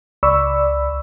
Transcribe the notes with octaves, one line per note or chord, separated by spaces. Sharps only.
C#2 D5 B5 C#6 E6